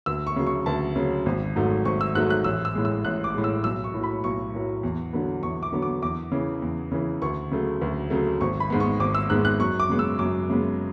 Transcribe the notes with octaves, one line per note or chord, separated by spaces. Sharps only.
D2 E6
C#6
C#3 F#3
C#6
D2 A5
C#3 F#3
G#1
G#2 F#3 A3
G#1 C#6
E6
G#2 F#3 A3 F#6
F#6
A1 E6
E6
A2 G#3
E6
A1 F#6
D6
A2 G#3
E6
B1 E6
C#6
A2 F#3
B5
B1 C#6
A2 F#3
E2
D3 F#3 B3
E2 C#6
D6
D3 F#3 B3
D6
E2 D6
C#3 E3
E2
C#3 E3
D2 C#6
C#3 F#3 A3
D2
C#3 F#3 A3
G#1 C#6
B5
G#2 G#3 B3
C#6
G#1 D6
E6
G#2 G#3 B3 F#6
F#6
F#2 C#6
D6
C#3 G#3 B3
E6
F#2 D6
C#3 G#3 B3